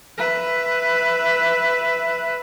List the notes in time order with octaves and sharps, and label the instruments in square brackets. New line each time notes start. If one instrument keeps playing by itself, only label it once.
[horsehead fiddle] B4 E5